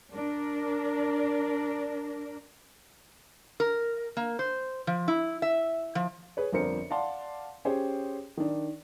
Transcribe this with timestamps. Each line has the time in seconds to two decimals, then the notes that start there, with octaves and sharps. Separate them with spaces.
0.13 D4 A#4
3.60 A#4
4.17 A#3
4.39 C5
4.87 F3
5.08 E4
5.42 E5
5.95 F3
6.37 G#4 B4 C#5
6.52 G1 F2 D4 A#4 C5 C#7
6.90 D5 F5 F#5 A5 C6
7.65 C#4 G4 G#4 C5 C#5
8.37 D#3 D4